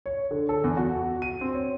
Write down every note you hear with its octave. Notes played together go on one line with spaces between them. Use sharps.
C#5
D3
A4
E2
F#4
D#7
C4
C#5